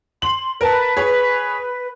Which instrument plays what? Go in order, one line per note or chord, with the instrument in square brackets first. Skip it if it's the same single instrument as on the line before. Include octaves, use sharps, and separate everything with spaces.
[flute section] C6 [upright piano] F#7
[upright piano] A#4 A5 [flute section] B4
[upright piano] G#4 C#5